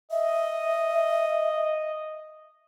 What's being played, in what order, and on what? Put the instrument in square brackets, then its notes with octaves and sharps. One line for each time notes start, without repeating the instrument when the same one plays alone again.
[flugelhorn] D#5 [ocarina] E5